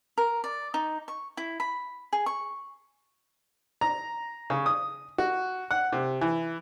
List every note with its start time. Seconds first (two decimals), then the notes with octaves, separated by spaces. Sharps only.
0.18 A#4
0.44 D5
0.74 D#4
1.08 C#6
1.37 E4
1.60 B5
2.13 G#4
2.26 C#6
3.81 A#5
4.50 C#3
4.66 D#6
5.18 F#4
5.71 F#5
5.93 C3
6.21 E3